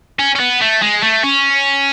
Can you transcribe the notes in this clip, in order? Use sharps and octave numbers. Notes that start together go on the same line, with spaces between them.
C#4
C#4
B3
A3
G#3
A3
C#4